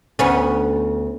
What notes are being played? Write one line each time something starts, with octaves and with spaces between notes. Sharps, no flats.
D2 B3 C#4